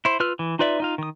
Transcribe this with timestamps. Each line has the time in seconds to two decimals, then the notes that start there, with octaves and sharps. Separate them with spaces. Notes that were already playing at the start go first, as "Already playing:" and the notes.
0.05 E4 C5
0.20 F4 B4 E6 F6
0.39 E3
0.59 D#4 F4 B4 D5 E5
0.80 D#4 F4 F5
0.98 D#3 D#6